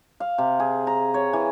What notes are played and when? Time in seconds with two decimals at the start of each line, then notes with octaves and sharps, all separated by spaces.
0.20 F5
0.38 C3
0.60 G#4
0.87 A#5
1.14 C#5
1.33 E3